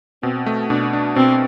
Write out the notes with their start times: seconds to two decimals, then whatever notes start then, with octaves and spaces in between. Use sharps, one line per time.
0.23 B2 C4
0.46 A3
0.70 B2 D4
0.93 D4
1.16 B2 C4